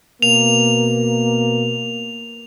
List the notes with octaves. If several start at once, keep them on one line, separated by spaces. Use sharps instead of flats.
B2 A#3 F7